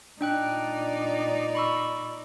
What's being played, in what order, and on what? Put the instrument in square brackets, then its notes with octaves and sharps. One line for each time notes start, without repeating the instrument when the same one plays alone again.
[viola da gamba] A#2 D#4 D5 [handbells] D4 G5 F#6
[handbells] B5 C#6 E6